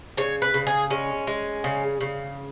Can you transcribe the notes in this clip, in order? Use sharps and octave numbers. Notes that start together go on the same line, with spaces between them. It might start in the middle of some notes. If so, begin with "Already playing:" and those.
C#3 C#5
B4
C#3
G#4
G#3 C#4
G#3
C#3
C#3